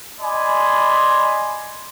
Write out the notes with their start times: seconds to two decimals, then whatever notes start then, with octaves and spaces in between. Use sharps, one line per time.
0.21 D5 D#5 G#5 B5 C6